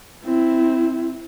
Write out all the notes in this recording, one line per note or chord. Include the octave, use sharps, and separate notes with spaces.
C4 E4